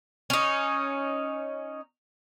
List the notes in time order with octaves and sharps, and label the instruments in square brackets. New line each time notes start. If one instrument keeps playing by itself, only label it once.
[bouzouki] C#4 D#4